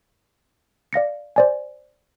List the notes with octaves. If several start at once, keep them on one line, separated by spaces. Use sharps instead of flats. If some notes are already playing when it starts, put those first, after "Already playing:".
D5 F5 A#6 C#7
C5 D5 G#5